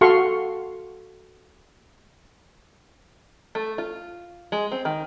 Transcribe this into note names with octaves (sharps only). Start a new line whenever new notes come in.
F#4 A4 F5 C6 C#6
A3
F4
G#3
C4
D#3